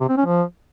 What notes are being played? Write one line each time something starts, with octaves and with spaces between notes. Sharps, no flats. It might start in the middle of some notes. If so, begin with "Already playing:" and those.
C3
C4
C#4
F3